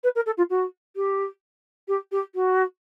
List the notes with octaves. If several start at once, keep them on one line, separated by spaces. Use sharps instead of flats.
B4
A#4
A4
F4
F#4
G4
G4
G4
F#4